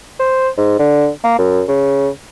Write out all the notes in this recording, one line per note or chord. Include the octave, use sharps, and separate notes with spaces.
C5
G#2
D3
A#3
F#2
C#3